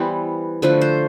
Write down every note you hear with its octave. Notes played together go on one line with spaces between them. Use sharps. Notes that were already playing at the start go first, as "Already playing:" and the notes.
Already playing: E3 G3 B3 C5
D3 F3 A3 B4
C5